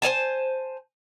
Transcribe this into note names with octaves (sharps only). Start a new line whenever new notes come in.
C5 C#5 G#5 A5